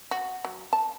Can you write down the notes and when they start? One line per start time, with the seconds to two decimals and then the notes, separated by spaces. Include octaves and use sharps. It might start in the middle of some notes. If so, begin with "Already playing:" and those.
0.11 F#4
0.45 F#3
0.73 A5